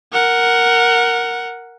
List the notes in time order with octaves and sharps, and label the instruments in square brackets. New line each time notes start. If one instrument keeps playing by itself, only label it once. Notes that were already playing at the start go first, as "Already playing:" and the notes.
[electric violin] A#4 F#5